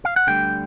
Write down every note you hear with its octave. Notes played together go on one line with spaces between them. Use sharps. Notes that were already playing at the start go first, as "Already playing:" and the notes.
F5
F#5
D2 D3 G3 G5